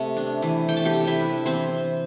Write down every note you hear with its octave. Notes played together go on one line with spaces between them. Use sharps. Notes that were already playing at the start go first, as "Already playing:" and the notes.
Already playing: C3 A3
D4
E3
A3 G5
A5
G4 G5
C3
E4 E5
D4
E3 C4 C5